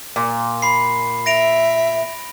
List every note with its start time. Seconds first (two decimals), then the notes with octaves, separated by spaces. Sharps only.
0.16 A#2
0.62 B5 C7
1.26 E5 A#6 D7 F7